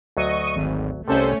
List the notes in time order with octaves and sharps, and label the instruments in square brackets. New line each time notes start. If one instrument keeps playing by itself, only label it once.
[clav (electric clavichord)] D2 F#3 [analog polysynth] D#5 C#6 D#7
[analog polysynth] G#1
[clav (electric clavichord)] C2 C3 [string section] A3 C#4 [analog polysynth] A4 C5